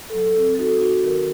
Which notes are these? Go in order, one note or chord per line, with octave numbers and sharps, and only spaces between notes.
F#3 A4
A4
C4
A4
D#4 F#4
D#4 F#4
D#3 A#4